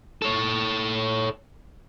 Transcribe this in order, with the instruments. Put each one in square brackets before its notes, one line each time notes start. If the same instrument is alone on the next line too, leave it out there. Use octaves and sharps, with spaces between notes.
[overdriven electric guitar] A4 C#5